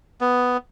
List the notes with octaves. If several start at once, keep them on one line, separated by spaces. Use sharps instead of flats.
B3